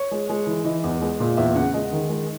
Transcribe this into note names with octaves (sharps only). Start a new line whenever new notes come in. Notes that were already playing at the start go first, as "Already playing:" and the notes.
Already playing: C#5
G#3
G#3
E3
E3 D#5
E2
G#3
A#2
E2 E5
C#3 F#5
G#3 D#5
D#3
G#3